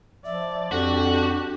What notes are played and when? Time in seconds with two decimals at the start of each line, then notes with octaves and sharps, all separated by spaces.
0.25 F3 D5 E5
0.72 F2 D4 F#4 G4 A4